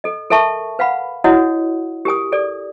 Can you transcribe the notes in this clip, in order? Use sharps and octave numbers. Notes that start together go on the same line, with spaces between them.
A4 D#5
A4 A#4 E5 A5 C#6
B4 F5 F#5 B5
E4 F#4 C#5 D#5 F#5 D#6
G4 A#4 G#5 D#6
G#4 A4 D5